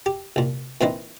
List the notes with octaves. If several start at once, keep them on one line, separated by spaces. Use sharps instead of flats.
G4
C2 A#2
A#2 E3 C4 D#4 E4